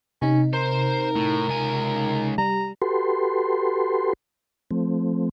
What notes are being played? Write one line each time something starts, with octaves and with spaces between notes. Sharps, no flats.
C3 C#4 D#4
A#4 C5
A2
C#2 G#5
G3 A#5
F#4 G4 A4 B4 C6
F3 A3 C4